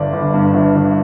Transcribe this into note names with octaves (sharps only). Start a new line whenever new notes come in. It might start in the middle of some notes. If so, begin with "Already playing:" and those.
Already playing: G1 G2 D3 D5
G1
G2
G1
G1